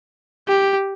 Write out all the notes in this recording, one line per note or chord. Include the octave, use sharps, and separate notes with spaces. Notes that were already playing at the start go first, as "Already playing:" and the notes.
G4